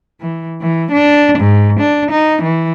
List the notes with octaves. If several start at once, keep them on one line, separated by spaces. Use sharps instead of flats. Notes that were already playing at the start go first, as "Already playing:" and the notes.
E3
E3
D4
G#2
D4
D#4
E3